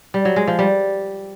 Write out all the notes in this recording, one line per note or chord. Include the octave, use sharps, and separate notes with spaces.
G3
F#3
G#3
F3
G3